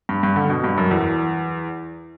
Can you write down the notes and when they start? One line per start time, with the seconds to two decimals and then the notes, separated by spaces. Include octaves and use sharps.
0.09 G2
0.23 G2
0.36 D3
0.50 B2
0.64 G2
0.78 F#2
0.91 E2